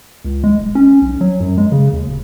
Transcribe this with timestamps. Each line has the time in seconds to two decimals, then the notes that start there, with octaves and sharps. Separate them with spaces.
0.25 C#2
0.44 G#3
0.58 D#1
0.75 C#4
1.02 B1
1.21 F#3
1.41 F#2
1.58 G#3
1.72 C#3
1.93 D#2
2.07 D#1